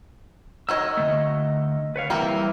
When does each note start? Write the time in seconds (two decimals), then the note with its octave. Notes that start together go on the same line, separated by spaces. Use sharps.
0.69 D#3 F#4 C#5 D#5 E6
0.97 D3 A3
1.96 B4 C#5 F5
2.10 E3 G3 A#3 C4 A#4